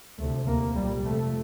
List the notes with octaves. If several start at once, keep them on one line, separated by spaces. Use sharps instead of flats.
D2 C3 A3
D#2 A#3
C2 A#2 G3
F2 C3 A3